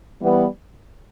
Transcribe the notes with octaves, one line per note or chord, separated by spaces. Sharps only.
E3 G3 B3